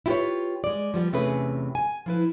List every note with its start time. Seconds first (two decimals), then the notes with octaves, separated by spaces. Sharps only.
0.06 E4 F4 G4 A4 B4 C#5
0.64 G#3 D5
0.94 F3 G3 B3
1.13 E2 C3 A3 C#4 G#4 B4
1.75 G#5
2.06 F3 E4 B4